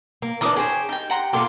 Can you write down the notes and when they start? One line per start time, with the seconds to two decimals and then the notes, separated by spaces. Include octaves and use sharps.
0.22 A#3
0.41 E3 D4 A#4 D6 D#6
0.57 G4 G#4 C5 C#5
0.89 D#4 G5
1.10 F#5 A#5 C6
1.33 A#3 D#4 F4 A4 C6 D6